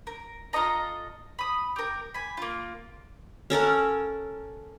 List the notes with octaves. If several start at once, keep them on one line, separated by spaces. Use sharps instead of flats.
A#4
F4 A4 D#5 A#5
B5 D#6
G4 A#4
G#5 B5
A#3 F4
C#4 A4 A#4 F#5